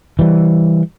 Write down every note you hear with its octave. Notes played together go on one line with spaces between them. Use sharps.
E3 G3